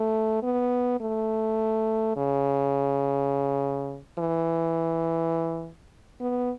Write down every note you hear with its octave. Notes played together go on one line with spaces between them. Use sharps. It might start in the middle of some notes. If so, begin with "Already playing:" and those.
Already playing: A3
B3
A3
C#3
E3
B3